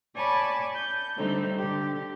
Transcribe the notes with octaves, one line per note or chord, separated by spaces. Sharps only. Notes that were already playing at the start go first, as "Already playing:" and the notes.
C#5 D5 G#5 A5 B5
G6
D3 G3 A3 C4 D#4
D3 G4